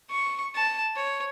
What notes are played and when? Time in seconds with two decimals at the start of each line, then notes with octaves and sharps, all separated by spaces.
0.10 C#6
0.55 A5
0.96 C#5